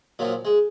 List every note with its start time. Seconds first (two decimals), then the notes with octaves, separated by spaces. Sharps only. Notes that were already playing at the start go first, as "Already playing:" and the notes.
0.19 A#2 F3 F#3
0.45 G#3